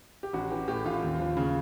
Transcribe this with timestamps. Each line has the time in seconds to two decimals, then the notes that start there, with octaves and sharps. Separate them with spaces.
0.23 G4
0.33 A1 F#4
0.51 E3 G4
0.68 A2 G4
0.85 A1 F4
1.03 D#2
1.20 F3
1.37 C#3